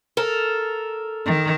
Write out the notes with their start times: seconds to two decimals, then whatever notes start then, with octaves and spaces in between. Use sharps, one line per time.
0.17 A4 A#4
1.26 D#3